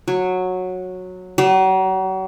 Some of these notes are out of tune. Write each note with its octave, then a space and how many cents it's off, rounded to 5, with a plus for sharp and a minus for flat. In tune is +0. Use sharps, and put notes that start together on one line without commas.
F#3 -10
F#3 +40